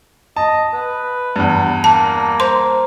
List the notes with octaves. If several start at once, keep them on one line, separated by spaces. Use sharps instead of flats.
D#5 A5
B4
E2 G2
A#3 A5
C5 A#5 C6